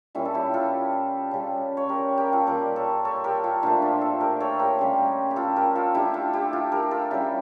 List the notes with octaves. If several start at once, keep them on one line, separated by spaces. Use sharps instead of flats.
A#2 G3 C#4 E4
A4
E4 G4
F4 A4
C#3 G3
C#5
G4 A#4
G4 A#4
F4 A4
A#2 G3 A#4 D5
A4 C#5
A4 C#5
G4 A#4
F4 A4
A#2 F3 A3 D4 F4
D4 F4
F4 A4
G4 A#4
A4 C#5
G4 A#4
C#3 G3
G4
F4 A4
G4 A#4
F4 A4
D3 A3 E4 G4
F4 A4
E4 G4
F4 A4
G4 A#4
F4 A4
C#3 G3 E4 G4